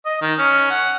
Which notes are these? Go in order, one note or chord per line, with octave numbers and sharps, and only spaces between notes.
D#5
D#3
C#4
F#5